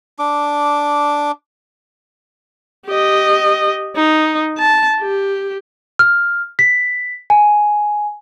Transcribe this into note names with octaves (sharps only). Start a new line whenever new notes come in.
D4 D6
G4 D#5
D#4
A5
G4
F6
B6
G#5